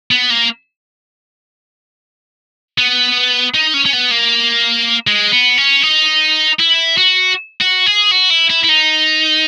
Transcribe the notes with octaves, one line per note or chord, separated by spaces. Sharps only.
B3
A#3
B3
D#4
C#4
C#4
B3
A#3
G#3
B3
C#4
D#4
E4
F#4
F#4
G#4
F#4
E4
E4
E4
D#4